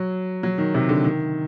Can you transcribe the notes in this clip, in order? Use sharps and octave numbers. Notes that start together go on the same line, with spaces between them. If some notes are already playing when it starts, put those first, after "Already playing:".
Already playing: F#3
F#3
D#3
C3
D3
D#3